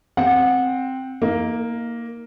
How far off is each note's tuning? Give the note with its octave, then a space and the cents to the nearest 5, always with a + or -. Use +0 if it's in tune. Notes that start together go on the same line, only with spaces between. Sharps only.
C4 +0 F#5 -20
A#3 +0 D#4 +35